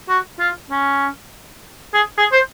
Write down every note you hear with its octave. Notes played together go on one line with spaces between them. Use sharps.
F#4
F4
C#4
G#4
G#4
C5